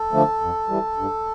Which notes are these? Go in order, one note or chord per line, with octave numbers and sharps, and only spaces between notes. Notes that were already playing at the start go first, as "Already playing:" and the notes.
Already playing: A4
D3 F3 A3
F2
E3 G3
G2